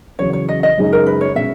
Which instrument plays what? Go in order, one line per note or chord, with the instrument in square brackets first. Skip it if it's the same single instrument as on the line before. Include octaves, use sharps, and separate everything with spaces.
[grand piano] E2 C#3 F#3 [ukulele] C#5
[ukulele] C#5
D#5
D#5
[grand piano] F#2 C#3 G#3 D#4 G#4
[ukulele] A#4
B4
C#5
[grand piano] B2 G#3 C#4 [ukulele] E5